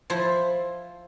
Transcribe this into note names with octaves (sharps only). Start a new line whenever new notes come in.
F3 E4 C5